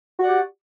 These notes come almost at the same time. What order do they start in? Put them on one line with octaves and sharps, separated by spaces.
F#4 F#5 D5 G4